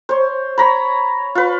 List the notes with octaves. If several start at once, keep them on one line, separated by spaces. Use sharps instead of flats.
C5 C#5
C#5 A#5 B5
F4 B4